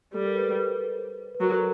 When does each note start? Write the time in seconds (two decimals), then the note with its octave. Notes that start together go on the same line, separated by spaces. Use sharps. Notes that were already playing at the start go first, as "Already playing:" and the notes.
0.14 G3 A4
0.24 A#4
0.35 B4
0.56 B4
0.68 C5
0.79 B4
1.35 B4
1.40 F#3 A#4
1.51 A4